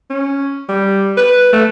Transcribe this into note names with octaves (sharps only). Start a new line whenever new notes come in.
C#4
G3
B4
A3